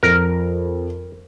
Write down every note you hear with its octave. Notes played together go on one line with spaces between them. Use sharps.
F2 A#4